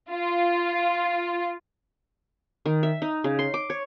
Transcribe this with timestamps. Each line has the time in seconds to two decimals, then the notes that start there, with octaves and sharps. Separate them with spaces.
0.11 F4
2.66 D#3
2.83 E5
3.02 D#4
3.24 C#3
3.39 C6
3.54 D6
3.70 C#5